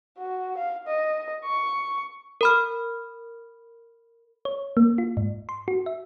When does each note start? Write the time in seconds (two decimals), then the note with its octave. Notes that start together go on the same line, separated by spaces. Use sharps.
0.19 F#4
0.58 F5
0.87 D#5
1.45 C#6
2.41 A#4 B5 F6
4.45 C#5
4.77 A#3
4.98 F4
5.17 G#2
5.49 C6
5.68 F#4
5.86 E5